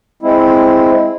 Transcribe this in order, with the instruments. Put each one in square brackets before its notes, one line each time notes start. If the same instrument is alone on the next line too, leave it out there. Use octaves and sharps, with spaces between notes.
[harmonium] G#3 C4 E4